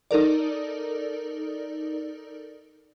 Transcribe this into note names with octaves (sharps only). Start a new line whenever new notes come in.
D#4 A4 A#4 D5